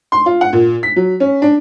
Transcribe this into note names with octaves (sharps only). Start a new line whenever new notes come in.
C6
F4
F#5
A#2
B6
F#3
C#4
D4